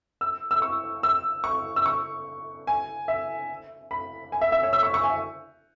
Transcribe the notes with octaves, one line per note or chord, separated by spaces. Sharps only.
E6
E6
C#6
E6
C#6
E6
C#6
G#5
E5
B5
G#5
E5
E5
C#5
E6
C#6
C#6
G#5